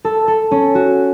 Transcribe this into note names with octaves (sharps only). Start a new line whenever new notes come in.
A4
A4
C#4
F#4